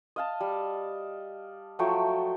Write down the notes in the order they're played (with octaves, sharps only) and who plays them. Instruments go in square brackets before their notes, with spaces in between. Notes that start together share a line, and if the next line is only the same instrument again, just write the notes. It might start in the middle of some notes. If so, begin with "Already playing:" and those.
[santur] D#5 F5 A5
G3
F3 F#3 A3 G5